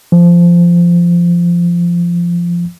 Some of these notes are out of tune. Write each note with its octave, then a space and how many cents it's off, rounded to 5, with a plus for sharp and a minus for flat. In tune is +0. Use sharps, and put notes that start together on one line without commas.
F3 -15